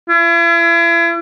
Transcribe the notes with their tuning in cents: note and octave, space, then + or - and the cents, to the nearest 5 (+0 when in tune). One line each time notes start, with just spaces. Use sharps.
E4 +40